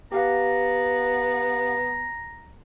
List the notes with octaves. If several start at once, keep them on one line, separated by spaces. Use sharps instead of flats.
B3 G4 F5 F#5 A#5